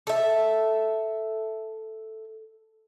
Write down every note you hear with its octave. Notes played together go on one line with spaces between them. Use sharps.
A4 E5